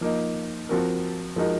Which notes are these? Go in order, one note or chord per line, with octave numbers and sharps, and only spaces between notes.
F3 A#3 D#4
F3 C4 F#4 A#4
F3 G#3 D#4 F#4 A#4